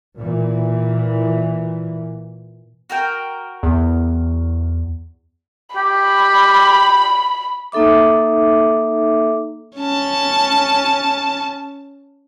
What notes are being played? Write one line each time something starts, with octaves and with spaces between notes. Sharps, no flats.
A#2 E3
F#4 A#4 G5
E2
G4 B5
A#3 D#4 A4 E5 D6
C#4 A5